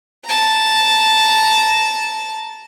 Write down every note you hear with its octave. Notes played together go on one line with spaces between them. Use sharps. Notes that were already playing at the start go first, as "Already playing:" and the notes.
A5 A#5